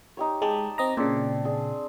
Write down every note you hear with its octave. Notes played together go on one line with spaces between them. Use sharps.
D#4 G4 C#5
G#3 G4 A5
C4 D#5 A#5
A#2 C#3 C4 D4 D6
D4 G#4